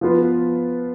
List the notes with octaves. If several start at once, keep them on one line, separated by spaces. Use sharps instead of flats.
F3 B3 F4 B4